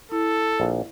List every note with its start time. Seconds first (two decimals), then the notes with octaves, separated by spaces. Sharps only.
0.12 E4 A4
0.60 A#1